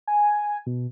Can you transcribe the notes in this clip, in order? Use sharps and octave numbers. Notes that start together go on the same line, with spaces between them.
G#5
B2